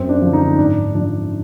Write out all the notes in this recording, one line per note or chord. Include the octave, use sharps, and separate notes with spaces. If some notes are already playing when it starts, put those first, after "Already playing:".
Already playing: F#2 C4
D4
D3 F3
D#4
G#2 D4
F3 D4